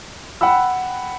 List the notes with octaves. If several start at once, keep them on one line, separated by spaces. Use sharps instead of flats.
F#5 G5 B5 E6